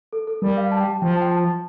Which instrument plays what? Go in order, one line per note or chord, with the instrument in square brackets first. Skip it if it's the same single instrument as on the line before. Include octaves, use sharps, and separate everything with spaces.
[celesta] A4
A4
[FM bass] G3 [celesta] A#4
[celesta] F5
A5
G5
A5
[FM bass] F3 [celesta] G5
[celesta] A5
G5
A5